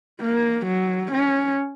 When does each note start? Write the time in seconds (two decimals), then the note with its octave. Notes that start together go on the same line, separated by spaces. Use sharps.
0.21 A#3
0.66 F#3
1.12 C#4